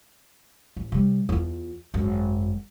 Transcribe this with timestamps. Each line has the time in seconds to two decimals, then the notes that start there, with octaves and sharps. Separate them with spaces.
0.77 A1
0.92 C3 G3
1.29 E2 F4
1.94 G#1 F#2